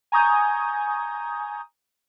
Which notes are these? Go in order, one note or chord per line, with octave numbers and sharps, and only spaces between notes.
G#5 A#5 C#6 D#6 G6 G#6